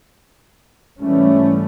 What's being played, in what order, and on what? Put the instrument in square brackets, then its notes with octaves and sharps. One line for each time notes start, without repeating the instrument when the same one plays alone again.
[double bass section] G#2 E3 G3 A3 C#4